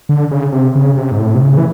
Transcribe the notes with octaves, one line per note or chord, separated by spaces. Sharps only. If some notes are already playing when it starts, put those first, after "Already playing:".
D3
C#3
C3
C#3
C3
G#2
A2
C3
C#3
E3